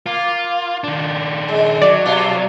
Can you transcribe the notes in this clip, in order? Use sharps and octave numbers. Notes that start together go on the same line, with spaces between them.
A#3 F4
D#3 D4
G#3
F#3 D5
B2 F4